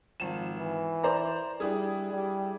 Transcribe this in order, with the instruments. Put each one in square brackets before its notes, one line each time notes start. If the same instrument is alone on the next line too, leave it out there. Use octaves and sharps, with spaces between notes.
[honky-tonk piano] G#1 E7 [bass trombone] F3
[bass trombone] E3
[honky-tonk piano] C5 D5 A#5
[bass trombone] G3 [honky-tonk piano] D4 E4 G#4
[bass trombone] G3